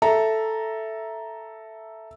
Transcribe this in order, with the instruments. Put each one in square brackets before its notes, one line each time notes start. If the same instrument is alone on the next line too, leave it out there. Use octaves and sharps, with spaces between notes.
[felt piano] A4 E5 A#5